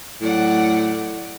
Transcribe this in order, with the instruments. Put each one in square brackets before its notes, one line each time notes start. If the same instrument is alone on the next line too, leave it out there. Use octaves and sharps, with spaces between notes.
[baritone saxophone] A2 [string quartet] F#3 D5 F#5